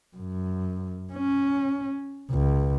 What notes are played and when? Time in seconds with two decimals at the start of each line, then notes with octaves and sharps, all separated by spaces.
0.16 F#2
1.13 C#4
2.30 C#2